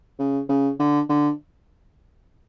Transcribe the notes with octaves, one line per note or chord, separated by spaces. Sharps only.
C#3
C#3
D3
D3